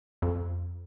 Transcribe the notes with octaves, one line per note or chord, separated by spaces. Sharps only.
F2